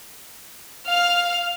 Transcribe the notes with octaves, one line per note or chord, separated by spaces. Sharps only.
F5 F6